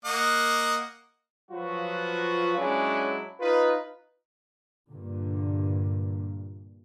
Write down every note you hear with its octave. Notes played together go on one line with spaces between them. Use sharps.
A#3 D#5 F#5
F3 F#3 F4 F#4 B4
F#3 G#3 C#4 D4 E4
D#4 F4 B4
G2 A#2 D3